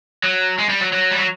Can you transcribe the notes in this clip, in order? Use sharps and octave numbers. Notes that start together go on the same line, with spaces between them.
F#3
G#3
G3
F#3
F#3
G3
F#3